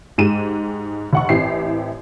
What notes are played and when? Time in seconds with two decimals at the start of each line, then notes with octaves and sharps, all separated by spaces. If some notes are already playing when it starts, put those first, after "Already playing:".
0.18 G#2 G#3 G4 D#7 E7
1.13 F1 F#5 C#6
1.29 A1 E3 C4 G4 E5 C7